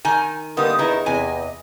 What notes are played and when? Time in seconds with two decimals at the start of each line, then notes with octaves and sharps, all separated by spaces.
0.05 D#3 G#5
0.57 D3 D#3 G3 A#3 B3 D#6
0.79 E2 D#3 E4 D#5
1.06 E2 C3 G#5